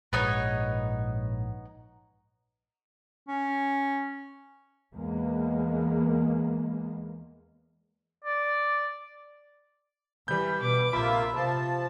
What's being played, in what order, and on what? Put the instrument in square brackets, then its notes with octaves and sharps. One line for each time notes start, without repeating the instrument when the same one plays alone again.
[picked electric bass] A#1 G#2 [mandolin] B3 D#4 C#5
[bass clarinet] C#4
[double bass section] E2 G#3 A#3 B3
[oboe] D5
[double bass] E3 [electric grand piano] G3 G6 [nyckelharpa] B5
[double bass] B2 [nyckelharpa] B4 D6
[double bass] A#1 [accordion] C3 A#3 F4 [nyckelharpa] E5 [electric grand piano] B5
[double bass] C3 [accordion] F3 A5 [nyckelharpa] F4